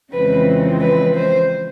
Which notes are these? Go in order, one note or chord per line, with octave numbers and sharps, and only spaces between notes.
F2 C#3 E3 G#3 C4 B4
B4
C5